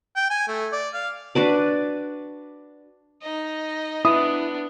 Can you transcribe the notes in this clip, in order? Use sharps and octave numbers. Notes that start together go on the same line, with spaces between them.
G5
G#5
A3
D5
F5
D4 F#4 B4 D5
D#4 D#5
B3 D4 E4 D#6